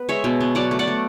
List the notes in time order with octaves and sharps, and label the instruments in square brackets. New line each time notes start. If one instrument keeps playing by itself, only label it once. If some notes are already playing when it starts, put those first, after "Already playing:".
Already playing: [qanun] B3 B4
G#3 C#5 E5
B2
B3
F#3 D5 F#5
A3
D5 F#5
A3